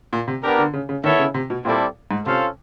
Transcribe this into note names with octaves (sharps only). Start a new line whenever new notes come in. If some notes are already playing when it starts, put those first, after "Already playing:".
A#2
C3
B3 D4 G4 A#4
D3
C#3
C#3
D#3 B3 E4 A4 C#5 E5
C#3
C3
B2
A#2 G3 C4 E4 A4 D5
G#2
C3 C#4 F4 A4 C5 F5